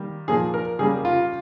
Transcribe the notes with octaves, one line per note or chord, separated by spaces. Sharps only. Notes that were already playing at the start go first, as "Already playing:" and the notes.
Already playing: D#3 G3 A#3
A#2 F3 A#3 G#4
A#4
C#3 G3 A#3 G#4
F4